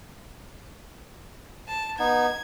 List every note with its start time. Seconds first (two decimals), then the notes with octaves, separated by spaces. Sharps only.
1.68 A5
1.99 B3 D#4 G#6